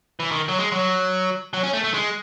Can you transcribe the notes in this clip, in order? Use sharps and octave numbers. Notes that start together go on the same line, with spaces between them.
E3
D#3
F#3
G#3
F#3
F#3
C#4
A3
A3
G#3